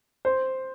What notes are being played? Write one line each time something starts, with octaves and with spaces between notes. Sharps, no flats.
C5